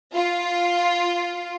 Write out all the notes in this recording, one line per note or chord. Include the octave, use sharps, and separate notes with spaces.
F4